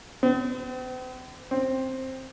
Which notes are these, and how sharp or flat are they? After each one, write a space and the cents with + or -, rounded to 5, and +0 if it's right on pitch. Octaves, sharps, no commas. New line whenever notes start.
C4 -45
C4 +5